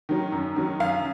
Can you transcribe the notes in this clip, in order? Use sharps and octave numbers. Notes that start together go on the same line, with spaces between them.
D#3 F#3
F#2
D#3 F#3
F#2 F5